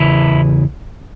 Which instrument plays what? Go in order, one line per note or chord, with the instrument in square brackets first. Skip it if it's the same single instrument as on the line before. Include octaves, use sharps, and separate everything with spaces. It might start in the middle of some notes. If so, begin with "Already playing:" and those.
Already playing: [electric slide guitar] E2 C#3 E3 E4